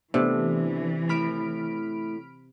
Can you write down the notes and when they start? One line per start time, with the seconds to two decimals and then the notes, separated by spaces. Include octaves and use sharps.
0.14 C3 E3 A3 B3 D4
1.09 A2 B5 F6 D7